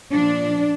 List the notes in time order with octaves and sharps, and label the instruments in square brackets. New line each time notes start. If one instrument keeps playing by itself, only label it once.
[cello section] A#2 F3 D4